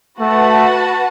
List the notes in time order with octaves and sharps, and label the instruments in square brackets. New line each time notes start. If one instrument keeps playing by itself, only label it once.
[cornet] A3 [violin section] F#4 B4 F#5 A5